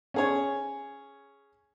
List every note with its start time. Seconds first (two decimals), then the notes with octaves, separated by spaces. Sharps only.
0.14 C#4 G#4 C#5